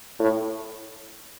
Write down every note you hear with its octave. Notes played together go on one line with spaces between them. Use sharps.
A2